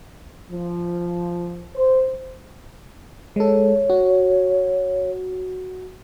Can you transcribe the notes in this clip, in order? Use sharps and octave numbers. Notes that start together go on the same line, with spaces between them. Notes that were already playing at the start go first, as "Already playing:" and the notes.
F3
C5
G#3 A4 C#5
F#4